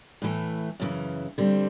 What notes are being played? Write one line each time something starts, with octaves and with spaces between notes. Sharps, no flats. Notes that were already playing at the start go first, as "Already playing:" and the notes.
A2 E3 A3
F#2 C#3 E3
D3 G3 C4